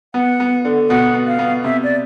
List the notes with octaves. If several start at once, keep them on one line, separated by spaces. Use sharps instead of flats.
B3 F#5
B3
D3
B2 F#5
B3
F5
B3
C3 E5
D5